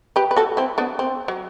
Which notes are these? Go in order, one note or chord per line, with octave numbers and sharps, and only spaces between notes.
G4 B4
B4
F#4 A4
C4 E4
B3 D4
C4
F#3